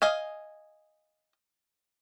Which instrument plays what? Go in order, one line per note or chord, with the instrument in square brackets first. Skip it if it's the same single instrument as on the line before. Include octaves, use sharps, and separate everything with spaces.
[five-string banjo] D#5 F5 G#5